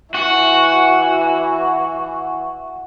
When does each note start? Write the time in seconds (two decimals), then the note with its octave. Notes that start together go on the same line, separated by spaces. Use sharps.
0.14 E3 F#4 F#5